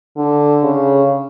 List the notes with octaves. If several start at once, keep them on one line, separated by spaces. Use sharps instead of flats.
D3
C#3